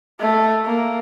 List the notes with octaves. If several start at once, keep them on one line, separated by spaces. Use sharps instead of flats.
A3
A#3